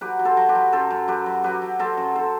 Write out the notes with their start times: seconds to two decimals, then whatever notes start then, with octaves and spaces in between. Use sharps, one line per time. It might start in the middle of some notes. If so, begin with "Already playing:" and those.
0.01 F#3 G4 B4
0.19 F#3
0.25 A4 C5
0.37 F#3
0.49 G4 B4
0.55 F#3
0.72 F#2 A4 C5
0.91 F#2
1.08 F#3 G4 B4
1.26 F#3
1.44 F#3 G4 B4
1.62 F#3
1.79 F#3 A4 C5
1.97 F#2
2.16 A4 C5